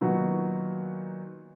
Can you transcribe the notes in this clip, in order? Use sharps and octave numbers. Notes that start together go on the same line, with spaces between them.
A#2 D#3 F#3 B3 D#4 F#4